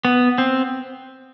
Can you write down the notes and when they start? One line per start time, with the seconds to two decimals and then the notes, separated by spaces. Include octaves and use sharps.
0.05 B3
0.38 C4